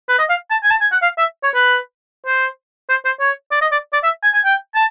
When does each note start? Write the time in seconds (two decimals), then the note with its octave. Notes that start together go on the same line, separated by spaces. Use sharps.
0.09 B4
0.19 D#5
0.29 F5
0.50 A5
0.63 G#5
0.71 A5
0.81 G#5
0.92 F#5
1.02 F5
1.18 E5
1.43 C#5
1.54 B4
2.26 C5
2.89 C5
3.05 C5
3.20 C#5
3.51 D5
3.61 D#5
3.72 D5
3.93 D5
4.03 E5
4.23 G#5
4.34 G#5
4.45 G5
4.75 A5